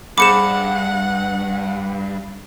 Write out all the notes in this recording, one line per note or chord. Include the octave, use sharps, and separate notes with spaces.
G2 G#4 C5 F#5 B5 D6 C#7 E7